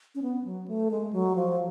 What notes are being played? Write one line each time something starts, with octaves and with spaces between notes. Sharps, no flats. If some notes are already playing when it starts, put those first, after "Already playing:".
C#4
B3
F#3
A3
G#3
F#3
F3